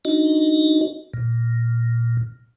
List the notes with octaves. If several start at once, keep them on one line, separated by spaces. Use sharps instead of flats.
D4 D#4 F#4 D#5
A#2